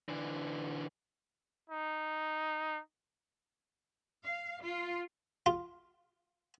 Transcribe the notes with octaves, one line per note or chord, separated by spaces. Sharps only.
D3 E3
D#4
F5
F4
F4